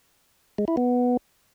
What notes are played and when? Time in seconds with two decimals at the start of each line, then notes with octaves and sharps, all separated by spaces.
0.58 G#3
0.68 E4
0.77 B3